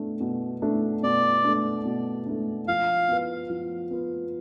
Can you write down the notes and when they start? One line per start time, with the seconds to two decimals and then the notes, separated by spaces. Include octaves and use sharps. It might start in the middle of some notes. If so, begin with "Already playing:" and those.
Already playing: B2 A3 D4
0.21 B2
0.62 A3 D4
1.03 B2 D5
1.44 A3 D4
1.85 B2
2.26 A3 D4
2.68 F3 F5
3.08 B3 F4 B4
3.50 F3
3.91 B3 F4 B4